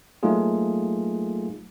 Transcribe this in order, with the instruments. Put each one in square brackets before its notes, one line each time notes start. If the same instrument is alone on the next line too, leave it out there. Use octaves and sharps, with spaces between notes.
[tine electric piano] F#3 A3 A#3 D#4 F4 G#4